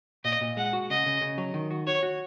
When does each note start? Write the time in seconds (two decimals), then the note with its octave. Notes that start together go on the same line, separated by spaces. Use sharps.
0.25 A#2 D#5
0.41 A#2
0.57 G#3 F#5
0.73 F#4
0.90 C#3 D#5
1.06 C#3
1.21 C#3
1.38 F#3
1.54 D#3
1.71 F#4
1.87 F#4 C#5
2.03 F#4